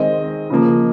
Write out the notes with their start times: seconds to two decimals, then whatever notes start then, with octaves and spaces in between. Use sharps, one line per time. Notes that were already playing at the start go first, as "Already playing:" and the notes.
Already playing: D#3 G#3 C4 D#5
0.50 C#3 F3 A#3